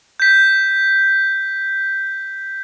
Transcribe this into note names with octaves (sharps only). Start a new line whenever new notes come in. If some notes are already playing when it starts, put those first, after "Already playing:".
G6 B6